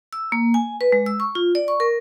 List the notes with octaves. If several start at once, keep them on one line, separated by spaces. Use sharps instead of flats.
E6
A#3
G#5
B4
G#3
E6
C#6
F4
D5
C#6
A#4